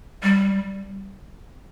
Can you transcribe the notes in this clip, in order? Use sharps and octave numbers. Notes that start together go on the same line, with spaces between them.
G3